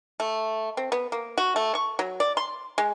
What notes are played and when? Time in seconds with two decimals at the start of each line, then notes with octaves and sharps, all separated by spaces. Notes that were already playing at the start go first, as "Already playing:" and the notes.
0.20 A3
0.77 C4
0.92 B3
1.12 A#3
1.38 F#4
1.56 A3
1.75 C#6
1.99 F#3
2.20 D5
2.37 C6
2.78 G#3